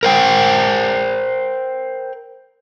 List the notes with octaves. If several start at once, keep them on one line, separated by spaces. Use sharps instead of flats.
A#4 C5 G5